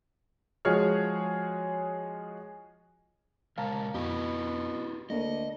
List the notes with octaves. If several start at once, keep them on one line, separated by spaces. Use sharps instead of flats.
F3 G#3 F#4 G#4 C#5 F6
C#3 G#3 A#4 F5 A5 A#5
F2 B2 E4 F#4 G4
D2 A3 A#3 D#5